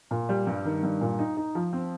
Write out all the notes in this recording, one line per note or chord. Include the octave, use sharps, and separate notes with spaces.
A#2
G3
G2
D#3
G2
A#2
D#4
D#4
F3
C4